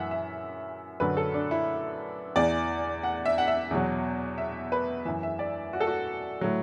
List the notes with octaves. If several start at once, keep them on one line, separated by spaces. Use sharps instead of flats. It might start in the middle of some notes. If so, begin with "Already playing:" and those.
Already playing: F#2 E3 E5 F#5
E5
F#2 D3 F#3 B4
A4
D4
E4
E2 E3 D5
F#5
E5
F#5
E5
E2 B2 F#3
E5
B4
F#2 E3 E5
E5
D5
F#4
A4
F#4
A2 F#3